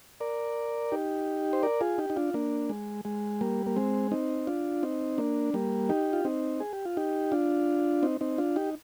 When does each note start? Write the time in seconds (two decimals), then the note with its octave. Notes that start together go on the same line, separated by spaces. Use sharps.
0.20 A#4 D5
0.92 D#4 G4
1.53 C5
1.63 A#4 D5
1.81 F4 G#4
1.98 D#4 G4
2.10 D#4
2.16 D4 F4
2.34 A#3 D4
2.70 G#3
3.05 G#3
3.41 G3 A#3
3.66 A#3
3.76 G#3 C4
4.12 C4 D#4
4.47 D4 F4
4.83 C4 D#4
5.18 A#3 D4
5.54 G3 A#3
5.89 D#4 G4
6.13 F4
6.25 C4 D#4
6.60 G#4
6.73 G4
6.85 F4
6.97 D#4 G4
7.32 D4 F4
8.03 C4 D#4
8.21 C4 D#4
8.38 D4 F4
8.56 D#4 G4